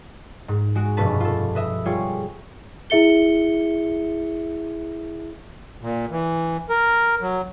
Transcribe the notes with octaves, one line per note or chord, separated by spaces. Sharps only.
G#2
G#3 F#4 D7
F1 G2 B2 C#4 B4 A5
F4 A4
B4 D#5 E5
G3 F4 G#4 C#5
E4 G#4 E5 C#7 G7
A#2
E3
A#4
F#3